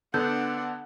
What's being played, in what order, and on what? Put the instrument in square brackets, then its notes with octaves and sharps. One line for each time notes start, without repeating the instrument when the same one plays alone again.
[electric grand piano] D3 B3 A4 [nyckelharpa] D4 F#5 [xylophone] G6